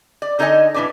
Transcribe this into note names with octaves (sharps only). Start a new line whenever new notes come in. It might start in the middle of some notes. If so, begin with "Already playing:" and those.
D5
D3 D#4 A4 D5 D#5 G#5
A2 E3 D4 B4 D5